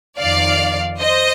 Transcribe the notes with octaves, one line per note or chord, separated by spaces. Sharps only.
F2 D#3 D5 F5
C5 D#5